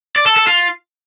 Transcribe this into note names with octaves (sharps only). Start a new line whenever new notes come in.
D5
A4
A4
F4